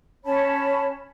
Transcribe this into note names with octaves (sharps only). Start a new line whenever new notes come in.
C#4 C#5 A5 B5